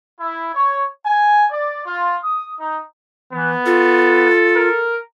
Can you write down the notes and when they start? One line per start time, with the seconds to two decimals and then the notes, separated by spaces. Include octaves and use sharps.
0.20 E4
0.54 C#5
1.04 G#5
1.52 D5
1.85 F4
2.22 D#6
2.59 D#4
3.33 E3 B3
3.66 F4 A4
4.56 A#4